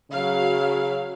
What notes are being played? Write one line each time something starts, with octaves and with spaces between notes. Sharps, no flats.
C#3 F#3 F5